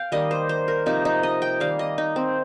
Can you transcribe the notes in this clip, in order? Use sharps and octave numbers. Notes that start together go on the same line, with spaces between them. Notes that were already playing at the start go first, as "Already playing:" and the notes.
Already playing: F5 G5
D#3 G3 A#3 D#5
C5
C5
A#4
C3 F3 A#3 D#4
D#4
D#5
G5
D#3 G3 A#3 F5
D#5
D#4
C4